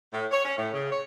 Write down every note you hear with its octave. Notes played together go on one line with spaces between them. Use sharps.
A2
C#5
C#4
A2
C#3
C#5